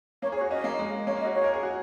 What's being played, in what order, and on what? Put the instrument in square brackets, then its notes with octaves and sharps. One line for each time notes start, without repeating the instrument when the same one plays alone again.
[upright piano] A#3 [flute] C#5
[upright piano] G#4
[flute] C#5
[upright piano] F#4
[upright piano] C#4 [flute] D#5
[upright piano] A#3
G#3
[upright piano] A#3 [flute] C#5
[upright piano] C#4
[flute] D#5
[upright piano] F#4
[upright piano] G#4 [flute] C#5
[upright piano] A#4
G#4
F#4